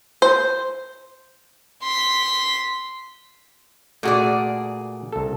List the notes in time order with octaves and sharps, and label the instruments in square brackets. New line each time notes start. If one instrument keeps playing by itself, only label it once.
[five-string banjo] C5
[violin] C6 B6
[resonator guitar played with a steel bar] A#2 G#4 D5 [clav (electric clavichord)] A3 F#4 F#5
[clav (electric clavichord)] C2 A4